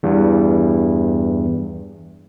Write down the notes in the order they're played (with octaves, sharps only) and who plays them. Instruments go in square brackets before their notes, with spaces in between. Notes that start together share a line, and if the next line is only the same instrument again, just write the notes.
[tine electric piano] E2 G2